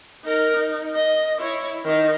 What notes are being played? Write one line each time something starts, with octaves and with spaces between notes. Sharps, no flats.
D#4 A#4
D#4
D#5
E4 C#5
D#3 D#4